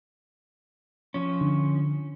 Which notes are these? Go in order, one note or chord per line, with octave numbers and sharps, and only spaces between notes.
F3 C#4
D3